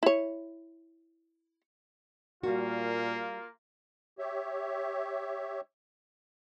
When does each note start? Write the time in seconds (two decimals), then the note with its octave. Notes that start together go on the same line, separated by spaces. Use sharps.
0.03 E4 C#5
2.43 A#2 G3 A#3 F4 F#4
4.19 G4 C#5 E5